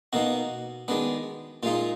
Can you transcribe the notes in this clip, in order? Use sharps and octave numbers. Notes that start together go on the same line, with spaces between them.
B2 A#3 D#4 F#4
D#3 G#3 B3 D4
A#2 G#3 D#4 F4